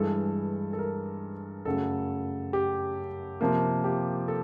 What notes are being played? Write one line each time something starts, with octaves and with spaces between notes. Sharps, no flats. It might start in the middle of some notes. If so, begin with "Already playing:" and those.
Already playing: G2 E3 G#3 A4
A4
A#4
F#2 C#3 F#3 A3 A4
G4
C3 F3 A#3
G4
A4